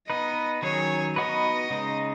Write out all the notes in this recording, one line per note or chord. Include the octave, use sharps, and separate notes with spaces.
B3 D#4 B4 D#5
D#3 F#3 C#4 G#4 C#5
B3 D#4 F#4 B4 D#5
C#3 G#3 D#4